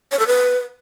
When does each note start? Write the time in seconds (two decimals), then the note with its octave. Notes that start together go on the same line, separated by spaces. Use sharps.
0.11 C#5
0.19 A4
0.27 B4